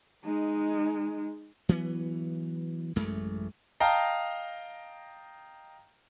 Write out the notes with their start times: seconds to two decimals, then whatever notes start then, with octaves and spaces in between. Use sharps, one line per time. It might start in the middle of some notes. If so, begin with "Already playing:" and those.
0.25 G#3 D#4
1.69 E3 F#3 A3 B3
2.96 A1 F#2 G#3 A3
3.80 D#5 F5 G5 A5 A#5